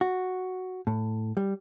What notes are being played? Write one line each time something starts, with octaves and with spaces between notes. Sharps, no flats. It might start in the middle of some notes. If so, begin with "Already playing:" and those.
F#4
A2
G3